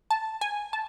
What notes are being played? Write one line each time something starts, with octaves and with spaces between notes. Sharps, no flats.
A5
G#5
A5